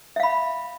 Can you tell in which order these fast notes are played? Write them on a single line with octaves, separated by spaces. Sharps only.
E5 F5 B5